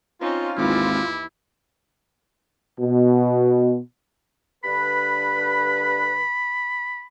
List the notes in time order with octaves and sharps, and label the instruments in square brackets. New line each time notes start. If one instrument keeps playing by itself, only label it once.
[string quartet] C4 C#4 D#4 [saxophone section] F4
[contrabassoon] G#1 [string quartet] D#2 E3 D6 [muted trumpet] E4
[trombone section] B2
[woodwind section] G2 D3 B4 [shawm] B5